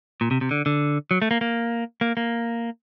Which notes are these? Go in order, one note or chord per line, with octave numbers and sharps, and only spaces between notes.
A#2
C3
C3
D3
D3
F#3
A3
A#3
A#3
A#3
A#3